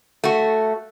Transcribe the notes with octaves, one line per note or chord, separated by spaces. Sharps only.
A3 F#4